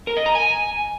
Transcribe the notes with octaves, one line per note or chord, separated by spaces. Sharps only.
A#4
D#5
A#5
G#5